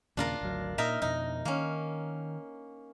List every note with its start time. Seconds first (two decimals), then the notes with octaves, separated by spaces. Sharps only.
0.17 D#2 A#2 C#3 D4 F4 A#4
0.41 G#1 D2 F#3
0.78 A#2 A#3 D#4 A#4 E5
1.02 F2 B2 D#4
1.45 D#3 A#3 C#4